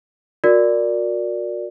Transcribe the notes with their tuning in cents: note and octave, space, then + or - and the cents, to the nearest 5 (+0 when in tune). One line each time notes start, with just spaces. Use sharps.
F#4 -30 A#4 -10 D5 +0